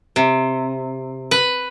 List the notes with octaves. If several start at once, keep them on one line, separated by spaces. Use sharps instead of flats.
C3
B4